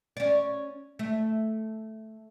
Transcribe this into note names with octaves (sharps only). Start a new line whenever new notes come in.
C#4 D5
A3